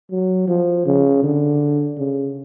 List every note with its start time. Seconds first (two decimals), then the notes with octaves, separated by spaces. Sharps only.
0.11 F#3
0.48 F3
0.86 C#3
1.23 D3
1.98 C#3